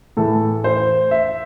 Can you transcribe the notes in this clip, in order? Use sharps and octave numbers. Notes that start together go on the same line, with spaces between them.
A2 E3 A4
C5
E5